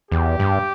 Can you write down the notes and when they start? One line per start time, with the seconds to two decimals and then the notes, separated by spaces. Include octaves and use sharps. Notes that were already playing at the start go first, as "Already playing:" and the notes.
0.11 E2 G4
0.40 G2